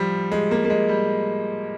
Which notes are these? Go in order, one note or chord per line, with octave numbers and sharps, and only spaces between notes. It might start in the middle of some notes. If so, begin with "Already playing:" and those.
Already playing: F3 G3
G#3
A#3
A#3
G#3
G3